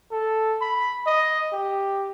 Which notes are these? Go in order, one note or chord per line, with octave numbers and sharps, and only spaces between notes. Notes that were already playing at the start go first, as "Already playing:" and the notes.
A4
B5
D#5
G4